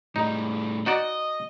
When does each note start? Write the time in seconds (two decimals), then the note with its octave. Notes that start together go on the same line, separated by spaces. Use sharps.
0.16 A2 G3 D#4
0.86 D#4 F#4 D5 D#5